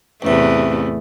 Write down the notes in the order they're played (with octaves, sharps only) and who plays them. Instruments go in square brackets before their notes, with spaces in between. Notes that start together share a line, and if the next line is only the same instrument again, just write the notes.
[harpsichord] A1 C3 [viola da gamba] E2 A3